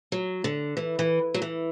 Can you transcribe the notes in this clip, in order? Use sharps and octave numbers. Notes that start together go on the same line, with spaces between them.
F#3
D3
E3
E3
F#3
E3